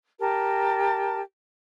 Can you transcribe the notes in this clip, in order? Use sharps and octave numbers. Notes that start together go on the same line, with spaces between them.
G4 A#4 A5